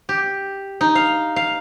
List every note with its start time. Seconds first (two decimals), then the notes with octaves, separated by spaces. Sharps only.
0.09 G4
0.81 D#4
0.95 F5
1.36 F5